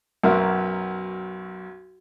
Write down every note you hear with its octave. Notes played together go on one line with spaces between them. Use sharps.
B1 F#2 F#4 A#4 E5 C6